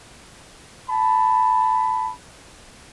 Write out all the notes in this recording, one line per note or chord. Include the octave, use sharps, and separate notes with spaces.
A5 B5